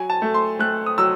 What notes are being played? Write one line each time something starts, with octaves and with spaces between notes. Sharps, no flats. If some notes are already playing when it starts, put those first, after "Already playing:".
Already playing: F#3 G#5
A5
A3
C6
A3 F#6
D#6
F#3 E6